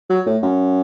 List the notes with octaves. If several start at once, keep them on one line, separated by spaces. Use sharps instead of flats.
F#3
A2
F#2